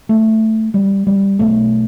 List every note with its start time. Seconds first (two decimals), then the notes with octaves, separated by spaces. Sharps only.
0.09 A3
0.74 G3
1.07 G3
1.39 B1 B2 A3